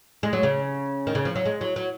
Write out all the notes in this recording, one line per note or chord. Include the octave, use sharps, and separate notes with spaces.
G#3
F#3
C#3
D#3
C#3
F3
F#3
G#3
F#3
F#3